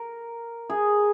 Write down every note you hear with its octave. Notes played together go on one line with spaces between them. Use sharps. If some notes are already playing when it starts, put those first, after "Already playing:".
Already playing: A#4
G#4